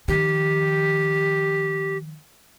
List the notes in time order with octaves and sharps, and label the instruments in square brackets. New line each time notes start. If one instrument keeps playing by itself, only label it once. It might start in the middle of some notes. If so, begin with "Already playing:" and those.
[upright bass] D#3 F3 [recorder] G4